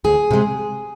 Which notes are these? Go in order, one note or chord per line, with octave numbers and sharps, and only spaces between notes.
D2 G#4
C3 G#3